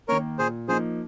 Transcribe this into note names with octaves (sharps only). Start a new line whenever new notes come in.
D#3 A#3 A#4 C#5
A#2 G#4 C5
F3 A#3 D#4 G#4 C5